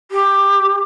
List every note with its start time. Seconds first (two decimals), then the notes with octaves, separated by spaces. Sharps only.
0.11 G4